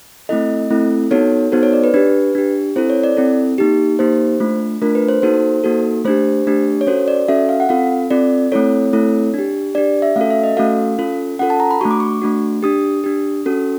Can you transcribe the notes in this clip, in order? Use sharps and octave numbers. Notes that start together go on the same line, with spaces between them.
A3 C4 E4 A4 D#5
A3 C4 E4 A4
B3 D#4 F#4 A4 C#5
B3 D#4 F#4 A4 C5
C#5
D5
B4
D4 G4 B4
D4 G4
C4 E4 A4 C5
C#5
D5
C4 E4 A4
A#3 D#4 G4
A#3 D#4 G4 C5
A3 D4 F4
A3 D4 F4 A#4
B4
C5
A#3 D#4 F#4 A4 C5
A#3 D#4 F#4 A4
A3 D4 G4 C5
A3 D4 G4
C#5
C#4 F#4 A4 C5
D5
C#4 F#4 A4 E5
F5
F#5
C4 F4 A4 F5
C4 F4 A4 D5
A3 C4 E4 A4 C#5
A3 C4 E4 A4
D4 G4
D4 G4 D5
E5
A3 C#4 F#4 A4 F5
E5
D#5
A3 C#4 F#4 A4 F5
C#4 F4 A4
C#4 F4 A4 F#5
A5
A#5
B5
A3 D4 F#4 C#6
D6
C#6
A3 D4 F#4
D4 G4 D#6
D4 G4
C#4 F#4 A4